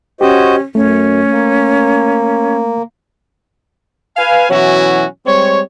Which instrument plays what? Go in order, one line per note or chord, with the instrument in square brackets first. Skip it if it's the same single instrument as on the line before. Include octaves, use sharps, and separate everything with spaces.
[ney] C#4 [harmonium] F#4 C5 D#5 [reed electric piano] G4
[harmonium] F#2 [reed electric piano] A3 [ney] C#4
[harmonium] A#3
[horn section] B4 F5 G#5
B2 E3 F#3 C#4 E4 F#4
G3 G#3 C4 C#5